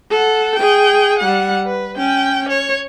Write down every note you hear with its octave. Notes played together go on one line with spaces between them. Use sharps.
A4 F#5
G#4 G5
G3 F#5
B4
C#4 G5
C#5